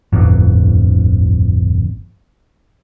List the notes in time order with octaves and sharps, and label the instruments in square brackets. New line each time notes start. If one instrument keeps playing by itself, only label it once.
[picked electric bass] D1 G1 F2